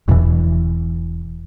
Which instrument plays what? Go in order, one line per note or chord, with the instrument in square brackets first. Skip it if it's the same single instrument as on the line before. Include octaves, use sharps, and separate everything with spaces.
[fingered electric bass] E1 E2 B2 E3